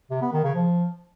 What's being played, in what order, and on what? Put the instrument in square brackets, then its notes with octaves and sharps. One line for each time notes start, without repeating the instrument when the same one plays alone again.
[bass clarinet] C3
B3
D#3
C#3
F3